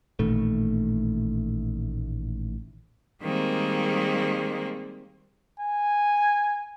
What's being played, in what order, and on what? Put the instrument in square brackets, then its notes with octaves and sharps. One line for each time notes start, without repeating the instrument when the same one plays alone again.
[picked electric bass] A1 A#2 D#3 A3
[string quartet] D#3 G3 G#3 A#3 C4
[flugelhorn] G#5